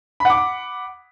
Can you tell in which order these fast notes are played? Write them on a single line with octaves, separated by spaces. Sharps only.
B5 F#5 D6